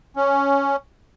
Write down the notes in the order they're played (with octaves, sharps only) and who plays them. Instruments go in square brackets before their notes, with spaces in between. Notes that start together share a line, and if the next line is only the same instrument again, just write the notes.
[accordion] C#4